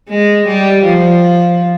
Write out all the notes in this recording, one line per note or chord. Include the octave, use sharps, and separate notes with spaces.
G#3
G3
F3